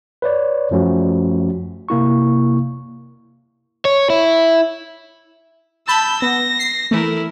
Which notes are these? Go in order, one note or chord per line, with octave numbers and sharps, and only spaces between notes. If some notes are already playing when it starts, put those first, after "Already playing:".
B4 C#5 D5
F#2 F3 A3 C#4 F#4
C3 A#3 E4 C#6
C#5
E4
A5 B5 E6 G6
B3 A#6
C7
E3 A3 E4 A#4